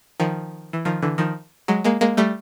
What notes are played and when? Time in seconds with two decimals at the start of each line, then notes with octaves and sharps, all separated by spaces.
0.20 D#3 F3
0.73 E3
0.85 D#3 F3
1.02 D3 E3
1.18 D#3 F3
1.68 F#3 G#3
1.84 G#3 A#3
2.01 G#3 A#3
2.17 G3 A3